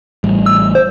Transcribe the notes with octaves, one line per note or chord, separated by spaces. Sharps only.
A1 G3
E6
C5